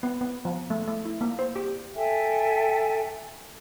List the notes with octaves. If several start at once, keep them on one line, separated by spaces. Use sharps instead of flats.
B3
B3
F3
A3
A3
E4
A#3
C5
G4
A4 E5 G5 G#5